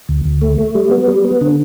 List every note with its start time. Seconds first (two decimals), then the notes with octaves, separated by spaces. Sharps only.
0.09 D2
0.25 D2
0.41 A3
0.58 A3
0.75 G3
0.91 B3
1.08 G3
1.24 B3
1.41 D3